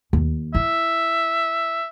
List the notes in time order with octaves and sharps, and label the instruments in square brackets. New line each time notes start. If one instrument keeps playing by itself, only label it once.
[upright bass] D#2
[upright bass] E4 [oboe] E5